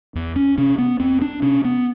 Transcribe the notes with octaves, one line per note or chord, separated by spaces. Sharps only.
E2
C#4
C3 C#4
B3
E2 C4
D4
C3 C#4
B3